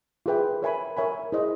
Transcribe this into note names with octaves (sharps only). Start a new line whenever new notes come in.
F4 G#4 B4 E5 G5
A#4 C#5 E5 G#5 B5
A#4 C#5 E5 G#5 B5
E4 G#4 C5 D#5